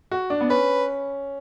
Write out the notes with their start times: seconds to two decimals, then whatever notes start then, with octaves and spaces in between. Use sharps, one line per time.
0.11 F#4
0.30 D4
0.41 B3
0.50 C#4 B4